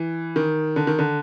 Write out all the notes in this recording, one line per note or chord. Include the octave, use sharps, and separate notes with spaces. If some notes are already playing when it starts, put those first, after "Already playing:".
Already playing: E3
D#3
D3
D#3
D3